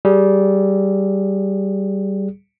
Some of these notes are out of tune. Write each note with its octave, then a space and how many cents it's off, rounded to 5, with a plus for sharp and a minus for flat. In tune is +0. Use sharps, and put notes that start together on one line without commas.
G3 -15 G#4 +0